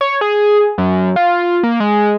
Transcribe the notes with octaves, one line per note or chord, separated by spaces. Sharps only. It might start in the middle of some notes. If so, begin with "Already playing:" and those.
C#5
G#4
F#2
F4
A#3
G#3